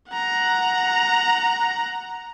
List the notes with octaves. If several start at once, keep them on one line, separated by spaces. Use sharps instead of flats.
F#5 A#5